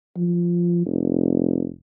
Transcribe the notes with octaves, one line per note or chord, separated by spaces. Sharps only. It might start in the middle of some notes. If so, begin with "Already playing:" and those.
F3
F1